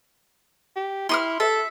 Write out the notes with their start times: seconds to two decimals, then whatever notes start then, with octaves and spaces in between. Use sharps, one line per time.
0.76 G4
1.09 E4 C6 D#6 F6
1.40 A4 E5